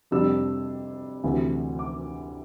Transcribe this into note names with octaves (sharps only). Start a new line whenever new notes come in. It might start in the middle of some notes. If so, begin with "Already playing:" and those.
F2 C3 G3 D4 E6
D2 C3 E3 A3 C4
D6